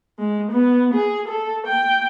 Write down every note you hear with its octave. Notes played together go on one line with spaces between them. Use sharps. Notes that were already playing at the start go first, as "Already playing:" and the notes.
G#3
B3
G#4
A4
G5